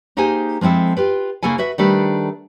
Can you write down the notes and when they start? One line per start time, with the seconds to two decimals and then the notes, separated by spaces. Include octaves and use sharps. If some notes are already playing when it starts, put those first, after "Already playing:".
0.17 A#3 D#4 G4 G#4 C5 G#5
0.61 F3 G#3 C4 E4 A4
0.97 F4 G4 B4
1.43 C#3 A#3 E4 A4 G#5
1.58 F#4 B4 E5
1.78 D#3 G3 A3 D4 A4 B4